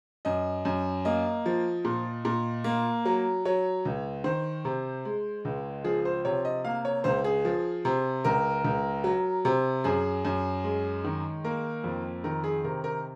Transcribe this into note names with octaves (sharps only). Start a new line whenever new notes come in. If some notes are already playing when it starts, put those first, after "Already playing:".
F#2 D#5
F#2
A#3 D#5
F3
A#2
A#2
A#3
F#3
F#3 C#5
C#2
D#3 C5
C3
G#3
C#2
F3 G#4
C5
C3 C#5
D#5
A#3 F5
C#5
C#2 C5
G#4
F3
C3
C#2 A#4
C#2
F#3
C3
F#2 G#4
F#2
G#3
D#3
A#3 A#4
F2
D#3 A#4
G#4
C3 A#4
A#4